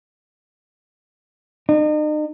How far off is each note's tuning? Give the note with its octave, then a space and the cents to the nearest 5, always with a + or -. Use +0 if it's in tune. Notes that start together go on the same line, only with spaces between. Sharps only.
D#4 -40